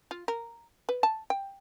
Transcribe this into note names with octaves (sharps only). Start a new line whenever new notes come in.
F4
A#4
B4
A5
G5